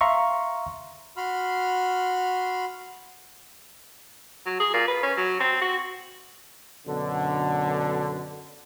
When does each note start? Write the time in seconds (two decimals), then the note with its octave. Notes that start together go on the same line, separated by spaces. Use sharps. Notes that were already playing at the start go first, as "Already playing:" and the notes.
0.01 E5 F5 A#5 C6 C#6
1.17 F#4 B5 C6 F6
4.46 F#3
4.60 G#4
4.73 A#2
4.88 B4
5.03 C#4
5.17 F#3
5.40 C4
5.61 F#4
6.87 F#2 B2 D3